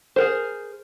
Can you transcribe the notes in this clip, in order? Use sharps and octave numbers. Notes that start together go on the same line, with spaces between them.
G#4 A#4 C5